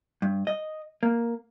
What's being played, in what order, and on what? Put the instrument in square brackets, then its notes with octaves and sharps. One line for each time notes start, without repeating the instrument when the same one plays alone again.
[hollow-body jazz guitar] G2
D#5
A#3